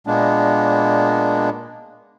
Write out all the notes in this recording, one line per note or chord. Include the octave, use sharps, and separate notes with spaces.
A#2 G#3 A#3 B3 D4